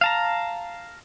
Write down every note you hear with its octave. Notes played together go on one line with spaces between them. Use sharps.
F5 A5 A#5